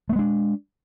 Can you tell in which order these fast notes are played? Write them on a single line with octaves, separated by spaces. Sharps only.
A3 B3 G#3 D4